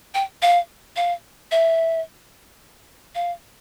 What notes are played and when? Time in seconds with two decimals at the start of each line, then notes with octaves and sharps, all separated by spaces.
0.14 G5
0.42 F5
0.96 F5
1.51 E5
3.15 F5